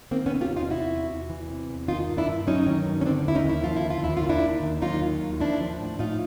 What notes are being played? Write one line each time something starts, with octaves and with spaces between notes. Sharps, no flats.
D#3 A#3 C4
B3 C#4
C3
F4 G4
E2
D#4 F4
C3 E4 F#4
E2
E2
E3
C3
E2
D#3 D#4 F4
G2
D4 E4
G2
F#3 C#4 D#4
D#3
G2
C#4
D3 C4 D4
D#2 E4
C#4 D#4
D#2
E4
F3 F4
E4
D3
F4
D#2 E4
F4
D#3
D4 E4
D#2
D#2
F#3 D#4 F4
D#3
D#2
F3 D4 E4
F3
A2
A2 D#4 F4